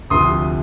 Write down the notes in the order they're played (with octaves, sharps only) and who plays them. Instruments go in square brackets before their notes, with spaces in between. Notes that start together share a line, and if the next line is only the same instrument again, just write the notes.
[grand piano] D2 C3 F3 C6 D#6